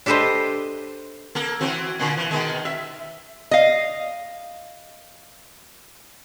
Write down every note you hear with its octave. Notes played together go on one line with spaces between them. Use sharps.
D4 G4 A4 B4 C5 D#5
A#3 A4
E3 C4 F#4
A#2 D3
E3
B2 D#3 G#3
E5
D#5 F5